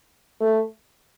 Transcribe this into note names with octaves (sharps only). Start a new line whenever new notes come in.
A3